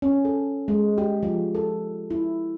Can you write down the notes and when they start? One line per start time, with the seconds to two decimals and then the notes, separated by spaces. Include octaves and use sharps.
0.02 C#4
0.25 A4
0.68 G#3
0.98 G4
1.23 F3
1.55 A4
2.10 E4